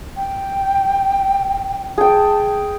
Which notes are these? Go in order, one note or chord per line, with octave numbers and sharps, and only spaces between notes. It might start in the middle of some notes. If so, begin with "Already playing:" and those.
G5
G#4 G5 A5